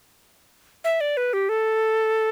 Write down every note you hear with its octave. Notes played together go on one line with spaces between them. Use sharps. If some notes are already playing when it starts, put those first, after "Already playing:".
E5
D5
B4
G4
A4